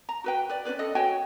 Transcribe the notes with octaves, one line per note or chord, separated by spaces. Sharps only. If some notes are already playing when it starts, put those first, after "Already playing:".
A#5
F#4 B4 G5
B4 D5
C#4 F4 B4 D5
A4 D#5
F#4 C#5 G5 G#5